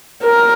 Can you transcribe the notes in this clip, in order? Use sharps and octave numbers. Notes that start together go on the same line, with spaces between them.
A#4